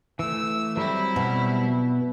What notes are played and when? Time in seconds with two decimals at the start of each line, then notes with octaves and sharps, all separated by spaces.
0.19 E3 A3 E6
0.77 F#3 G3 C4 E4
1.16 B2